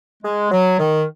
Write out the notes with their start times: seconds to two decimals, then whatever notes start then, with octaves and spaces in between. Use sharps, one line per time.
0.23 G#3
0.51 F#3
0.79 D#3